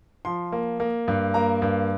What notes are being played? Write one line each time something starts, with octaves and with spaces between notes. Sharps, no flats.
F3 C6
A#3
A#3
G2
A#3 A#5
G2